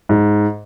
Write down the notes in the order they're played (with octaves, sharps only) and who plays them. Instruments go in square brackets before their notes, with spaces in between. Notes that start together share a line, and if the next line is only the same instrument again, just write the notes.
[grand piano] G#2